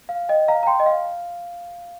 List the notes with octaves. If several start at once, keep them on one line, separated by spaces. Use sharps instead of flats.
F5
D#5 G5
F5 A#5
A#5
G5 C6
D#5
F5